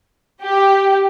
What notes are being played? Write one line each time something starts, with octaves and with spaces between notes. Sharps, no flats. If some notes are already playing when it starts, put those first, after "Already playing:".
G4